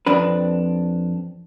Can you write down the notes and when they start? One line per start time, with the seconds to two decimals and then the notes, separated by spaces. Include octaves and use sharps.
0.06 F2 C4 D4 B4